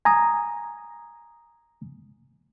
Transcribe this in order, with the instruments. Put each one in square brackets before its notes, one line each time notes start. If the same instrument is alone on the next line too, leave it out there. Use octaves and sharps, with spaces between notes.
[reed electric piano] G#5 A#5 D#6